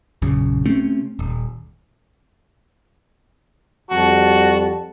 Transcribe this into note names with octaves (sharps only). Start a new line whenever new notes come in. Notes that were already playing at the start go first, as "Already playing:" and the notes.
A#1 F#2 C#3
C3 A3 C4 C#4
D#1
F2 G3 F#4 A5